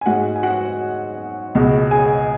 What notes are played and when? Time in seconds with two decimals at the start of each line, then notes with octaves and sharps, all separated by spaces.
0.01 G#5
0.06 G#2 G#3 F#4 F#5
0.36 G#5
0.43 F#4 F#5
1.55 C#2 B2 G#3
1.91 G#4 G#5